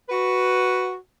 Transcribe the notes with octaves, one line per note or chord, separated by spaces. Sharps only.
F#4 B4